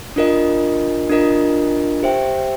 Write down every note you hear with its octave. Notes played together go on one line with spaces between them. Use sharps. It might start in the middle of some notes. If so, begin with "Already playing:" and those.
D4 F4 A#4 D#5
D4 F4 A#4 D#5
G4 C5 E5 G5